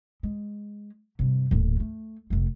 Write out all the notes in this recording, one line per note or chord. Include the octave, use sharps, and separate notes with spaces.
G#3
G2 C3
D#1 A2
G#3 A3
F1 A3